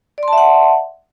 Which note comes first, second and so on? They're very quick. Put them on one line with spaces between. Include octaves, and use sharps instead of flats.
D5 C6 A5 E5 F#5